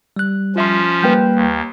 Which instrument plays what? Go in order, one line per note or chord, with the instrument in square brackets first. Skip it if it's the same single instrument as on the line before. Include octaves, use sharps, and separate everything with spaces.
[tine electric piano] G3 F#6
[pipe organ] F3 C#4 [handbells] F4 E5 C6
[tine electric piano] G3 A#3 [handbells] B4 G5 G6
[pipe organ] D#2